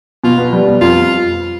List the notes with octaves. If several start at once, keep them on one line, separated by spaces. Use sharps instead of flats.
B2 F4
B3
G3
B2
F2 F4